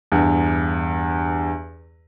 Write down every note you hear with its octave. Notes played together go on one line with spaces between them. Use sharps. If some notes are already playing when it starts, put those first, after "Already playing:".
E2 G2